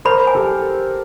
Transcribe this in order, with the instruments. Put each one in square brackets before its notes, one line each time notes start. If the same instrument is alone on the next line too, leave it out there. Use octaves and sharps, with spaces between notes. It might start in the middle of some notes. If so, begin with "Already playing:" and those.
[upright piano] A#4 C5 [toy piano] B5
[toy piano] G#5
[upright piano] G4 A4